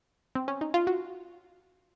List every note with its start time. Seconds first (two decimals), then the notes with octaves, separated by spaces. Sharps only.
0.35 C4
0.48 C#4
0.61 D#4
0.74 F4
0.87 F#4